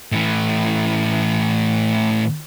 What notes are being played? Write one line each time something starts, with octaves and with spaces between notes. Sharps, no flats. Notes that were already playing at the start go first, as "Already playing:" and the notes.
A2 E3